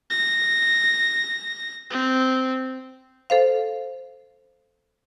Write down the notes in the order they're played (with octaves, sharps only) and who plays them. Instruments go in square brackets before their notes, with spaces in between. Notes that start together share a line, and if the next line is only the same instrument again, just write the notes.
[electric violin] A#6
C4
[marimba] A4 C5 F5